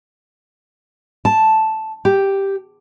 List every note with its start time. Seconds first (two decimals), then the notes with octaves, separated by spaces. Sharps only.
1.25 A5
2.05 G4